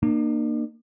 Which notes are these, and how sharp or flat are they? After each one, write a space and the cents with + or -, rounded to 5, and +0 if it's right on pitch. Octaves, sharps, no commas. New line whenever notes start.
A#3 +0 D4 +45